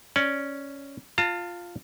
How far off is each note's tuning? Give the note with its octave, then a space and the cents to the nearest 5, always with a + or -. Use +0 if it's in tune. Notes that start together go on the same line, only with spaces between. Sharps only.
C#4 +0 D5 +0
F4 +0 A5 +40